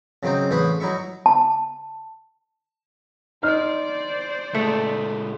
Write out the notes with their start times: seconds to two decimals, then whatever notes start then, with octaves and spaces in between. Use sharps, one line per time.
0.23 C#3 F#3 C4 D#4 C5
0.51 A1 C#4 G#4 B4 C5 B5
0.80 F#3 D#4 E4 E5 C#6
1.26 A5
3.43 D#4 C5 D5 F6
4.55 A#2 G#3 A3